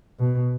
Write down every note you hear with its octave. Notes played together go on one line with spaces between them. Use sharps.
B2